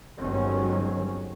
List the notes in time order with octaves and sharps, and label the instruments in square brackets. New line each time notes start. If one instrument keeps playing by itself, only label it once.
[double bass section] G1 D#3 F#3 G#3 C4 C#4